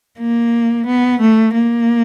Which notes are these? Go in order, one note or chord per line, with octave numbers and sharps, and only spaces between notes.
A#3
B3
A3
A#3